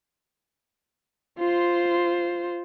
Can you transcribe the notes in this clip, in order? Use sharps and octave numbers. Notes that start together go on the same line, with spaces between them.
F4 C5